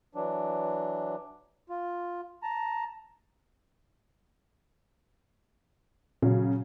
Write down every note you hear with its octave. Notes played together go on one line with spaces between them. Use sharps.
E3 F#3 D4
F4
A5 A#5
A#2 C#3 F#3